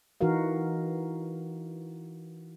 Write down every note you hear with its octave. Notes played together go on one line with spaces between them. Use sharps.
E3 D#4 F#4 A#4 F5